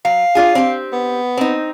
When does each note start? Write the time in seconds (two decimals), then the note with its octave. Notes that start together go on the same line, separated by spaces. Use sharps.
0.05 F#3 F5
0.35 D4 F4 G#4
0.55 C4 G4
0.92 B3
1.37 C4 D#4